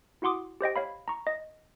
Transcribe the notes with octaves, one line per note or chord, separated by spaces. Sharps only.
E4 F#4 F#5 C6 D6 D#6
G4 C5 D#5 G5
C#5 F5 B5
A#5 C#6
D#5